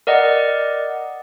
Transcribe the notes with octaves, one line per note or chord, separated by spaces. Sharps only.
A#4 D5 D#5 F#5